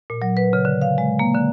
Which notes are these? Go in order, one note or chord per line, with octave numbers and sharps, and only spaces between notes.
A#2
F#3
B4
C#3
D3
F5
G#3
A#3
D3